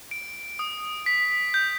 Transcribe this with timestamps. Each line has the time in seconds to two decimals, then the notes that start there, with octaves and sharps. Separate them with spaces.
0.11 D7
0.59 D#6
1.06 B6
1.54 G6